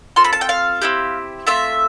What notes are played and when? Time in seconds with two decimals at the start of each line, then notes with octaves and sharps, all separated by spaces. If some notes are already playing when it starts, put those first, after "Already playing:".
0.16 C4 F4 A4 C6
0.24 B5
0.33 A5
0.41 G5
0.49 F5
0.82 C4 E4 G4
1.47 A3 C4 F4 E5